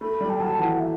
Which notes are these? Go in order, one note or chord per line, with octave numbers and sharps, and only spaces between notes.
A3 B5
G3
G5
F#3 A5
E3 F#5
E5